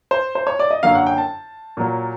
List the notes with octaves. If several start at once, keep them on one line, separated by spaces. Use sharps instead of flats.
C5
C5
C#5
D5
D#5
F#2 D3 F#3 A#3 F5
F#5
G5
A5
A#2 F#3 A#3